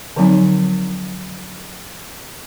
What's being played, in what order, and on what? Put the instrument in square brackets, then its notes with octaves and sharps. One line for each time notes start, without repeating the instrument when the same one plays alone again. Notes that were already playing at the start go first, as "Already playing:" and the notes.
[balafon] D3 F3 F#3 C4 D#4